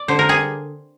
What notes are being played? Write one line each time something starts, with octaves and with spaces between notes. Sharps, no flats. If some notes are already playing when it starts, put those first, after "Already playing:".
Already playing: D5
D3 C5
A#4
G3 G#4